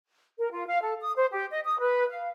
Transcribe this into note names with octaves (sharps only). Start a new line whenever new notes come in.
A#4
F4
F5
A4
D#6
C5
G4
D#5
D#6
B4
F5